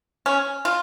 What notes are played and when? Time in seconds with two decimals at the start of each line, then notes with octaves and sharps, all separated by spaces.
0.26 C#4
0.65 F4